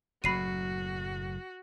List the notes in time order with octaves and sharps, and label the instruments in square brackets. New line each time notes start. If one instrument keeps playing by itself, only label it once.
[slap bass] F#1 A2 F#3 [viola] F#4 [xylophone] B5 C7 D#7